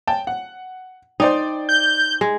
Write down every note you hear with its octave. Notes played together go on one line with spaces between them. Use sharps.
G5 A5
F#5
D#4 C5 D5 G5
G6
G#3